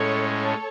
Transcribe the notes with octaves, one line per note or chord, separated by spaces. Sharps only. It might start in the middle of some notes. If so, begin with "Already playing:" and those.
Already playing: A2 G#3 C#4 A4 C#5
A4 C#5